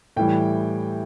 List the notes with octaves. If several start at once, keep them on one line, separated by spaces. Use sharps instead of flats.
A2 E3 G3 G5